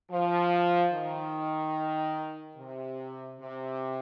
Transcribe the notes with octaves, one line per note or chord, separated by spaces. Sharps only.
F3
D#3
C3
C3